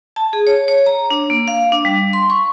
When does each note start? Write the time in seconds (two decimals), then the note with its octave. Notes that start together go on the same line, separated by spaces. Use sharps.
0.16 A5
0.33 G#4
0.47 C#5
0.68 C#5
0.86 A#5
1.10 D4
1.30 A#3
1.48 F5
1.72 D4
1.85 G3
2.13 C6
2.30 C#6